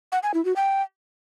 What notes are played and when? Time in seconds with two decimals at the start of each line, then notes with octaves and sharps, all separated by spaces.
0.12 F#5
0.23 G#5
0.34 E4
0.45 F#4
0.56 G5